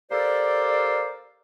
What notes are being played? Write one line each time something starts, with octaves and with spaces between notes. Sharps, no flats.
A#3 G4 A4 C5 D5